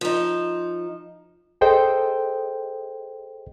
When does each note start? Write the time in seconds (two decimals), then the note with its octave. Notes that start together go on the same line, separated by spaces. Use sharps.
0.01 F3 D#4
1.61 G#4 A4 C5 D#5 G5